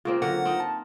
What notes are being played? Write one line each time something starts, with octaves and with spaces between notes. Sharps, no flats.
C#3 A#3 C4 F4 C5
D3 F#3 A#4 F#5
C4 D#4
A5